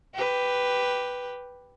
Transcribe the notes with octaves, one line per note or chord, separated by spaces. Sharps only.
G4 B4